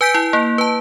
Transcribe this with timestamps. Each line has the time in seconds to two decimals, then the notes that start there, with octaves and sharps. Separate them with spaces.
0.01 B4 G#5 G6 B6 D7
0.14 E4
0.33 A#3
0.58 B4 A5